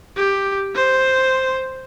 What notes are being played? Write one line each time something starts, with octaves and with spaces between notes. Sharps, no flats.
G4
C5